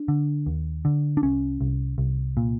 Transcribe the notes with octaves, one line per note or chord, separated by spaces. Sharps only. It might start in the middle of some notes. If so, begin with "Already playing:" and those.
Already playing: D4
D3
D#2
D3
D4
C2 C#4
C2
C2
A#2